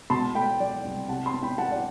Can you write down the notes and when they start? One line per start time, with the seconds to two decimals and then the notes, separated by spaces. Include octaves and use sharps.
0.10 B2 A5 C6
0.35 A3 G5 B5
0.60 F#3 D5
0.85 C2
1.09 C3 F#5 A5
1.25 A5 C6
1.34 B3
1.42 G5 B5
1.58 F#3 F#5 A5
1.71 D5 F#5